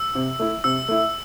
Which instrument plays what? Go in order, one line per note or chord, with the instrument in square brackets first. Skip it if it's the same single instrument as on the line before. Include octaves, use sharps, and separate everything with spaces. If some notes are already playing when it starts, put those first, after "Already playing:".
Already playing: [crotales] E6
[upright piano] C3
A3 E4
[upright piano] C3 [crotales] E6
[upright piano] A3 E4